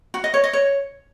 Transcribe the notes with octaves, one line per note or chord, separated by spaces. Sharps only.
F#4
D#5
C#5
D#5
C#5